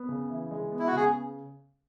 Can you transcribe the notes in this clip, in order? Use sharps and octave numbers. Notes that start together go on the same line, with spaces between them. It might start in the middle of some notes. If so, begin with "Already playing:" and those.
Already playing: B3
C#3
E3
G#3
B3
E4
F#4
C#3 G#4